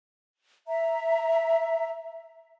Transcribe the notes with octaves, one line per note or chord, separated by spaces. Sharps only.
E5 A#5